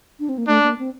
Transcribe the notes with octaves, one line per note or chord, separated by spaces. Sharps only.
D4
C4
A#3
A3 D4
A#3
C4